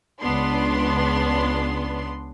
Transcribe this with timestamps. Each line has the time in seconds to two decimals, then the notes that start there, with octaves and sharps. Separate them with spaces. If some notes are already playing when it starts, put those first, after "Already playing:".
0.20 C#2 C#3 B3 D4 C6